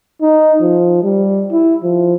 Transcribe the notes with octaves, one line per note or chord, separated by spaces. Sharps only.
D#4
F3
G3
E4
F3